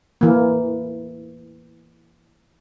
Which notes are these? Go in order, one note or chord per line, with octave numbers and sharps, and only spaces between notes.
E3 A#3